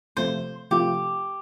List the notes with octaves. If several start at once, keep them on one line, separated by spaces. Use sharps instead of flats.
C3 F3 A3 F4 C5
C3 F3 A3 F4 G4